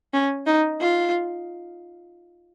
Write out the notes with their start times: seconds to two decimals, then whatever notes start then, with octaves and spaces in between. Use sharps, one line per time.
0.13 C#4
0.46 D#4
0.81 F4